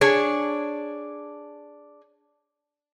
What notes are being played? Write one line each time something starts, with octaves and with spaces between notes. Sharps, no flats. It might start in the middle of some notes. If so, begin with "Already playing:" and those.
D4 G#4 C#5